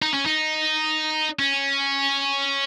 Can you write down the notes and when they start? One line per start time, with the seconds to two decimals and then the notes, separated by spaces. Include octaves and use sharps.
0.02 D#4
0.14 C#4
0.26 D#4
1.39 C#4